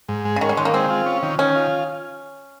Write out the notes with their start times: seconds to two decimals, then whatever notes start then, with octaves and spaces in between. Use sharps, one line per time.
0.09 G#2
0.25 G#3
0.36 C#3
0.41 D#3 C#4
0.49 G3
0.57 D#3 G#3
0.65 A#3
0.73 G#3 C4
0.90 F4
1.06 C#4
1.23 D#3
1.39 D#3 C#4
1.56 F4